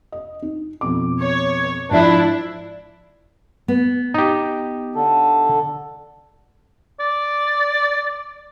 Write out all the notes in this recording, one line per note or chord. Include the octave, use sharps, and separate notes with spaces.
D#5
D#4
F2 B2 D6
C#5
G#2 F3 D4 E4
B3
D#4 G4
D3 A4
D5